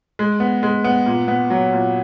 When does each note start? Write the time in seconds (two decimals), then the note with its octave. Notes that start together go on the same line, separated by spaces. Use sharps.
0.19 G#3
0.40 B3
0.63 G#3
0.84 B3
1.06 A#2
1.28 B3
1.50 F#3
1.73 A#2